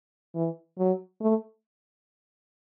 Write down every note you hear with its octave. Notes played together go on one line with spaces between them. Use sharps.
E3
F#3
A3